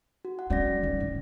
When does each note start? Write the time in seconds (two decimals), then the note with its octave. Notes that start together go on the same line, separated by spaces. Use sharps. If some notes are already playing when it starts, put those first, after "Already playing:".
0.25 F#4
0.39 F#5
0.50 F#3 C4 C#4 D5 A#6
0.83 D#3 G3
1.00 A2